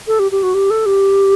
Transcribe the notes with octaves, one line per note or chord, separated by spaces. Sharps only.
A4
G4
G4
F#4
G4
A4
G4